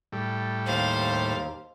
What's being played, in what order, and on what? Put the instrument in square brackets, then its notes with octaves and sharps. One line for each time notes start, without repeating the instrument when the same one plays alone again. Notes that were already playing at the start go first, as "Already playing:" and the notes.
[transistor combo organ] A2 G3
[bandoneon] D#2 [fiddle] C5 F5